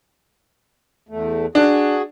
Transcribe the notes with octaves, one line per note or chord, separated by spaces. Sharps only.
E2 A3
D4 F#4 G#4